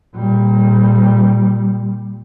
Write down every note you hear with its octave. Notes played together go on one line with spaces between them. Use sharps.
A#2 G3